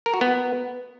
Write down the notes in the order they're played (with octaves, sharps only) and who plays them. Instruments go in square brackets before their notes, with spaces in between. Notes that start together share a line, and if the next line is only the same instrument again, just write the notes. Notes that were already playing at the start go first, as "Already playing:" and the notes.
[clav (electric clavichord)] A#4
F#4
B3